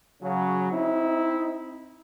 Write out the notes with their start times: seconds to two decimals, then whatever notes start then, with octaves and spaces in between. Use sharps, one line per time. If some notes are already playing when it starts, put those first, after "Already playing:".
0.22 C#3 F#3
0.72 C4 D#4 E4